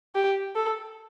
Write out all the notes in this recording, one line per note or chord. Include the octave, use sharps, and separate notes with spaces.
G4
A4